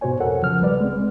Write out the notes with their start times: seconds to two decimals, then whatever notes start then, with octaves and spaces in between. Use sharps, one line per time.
0.01 G#2 B2 F#4 C5 C#5 G#5
0.20 F2 A4 A#4 F#5
0.42 C#3 F3 F6
0.61 C2 G3 B4 D5
0.81 G#3 C4